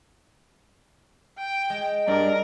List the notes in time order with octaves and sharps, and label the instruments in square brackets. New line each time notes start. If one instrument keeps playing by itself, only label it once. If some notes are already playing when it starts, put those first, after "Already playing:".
[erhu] G5
[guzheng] G#3
[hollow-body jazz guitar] G2 D4 [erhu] A#4